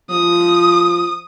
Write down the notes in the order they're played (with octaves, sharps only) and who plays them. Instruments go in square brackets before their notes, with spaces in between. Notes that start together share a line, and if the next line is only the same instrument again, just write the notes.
[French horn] F3 [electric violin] D#6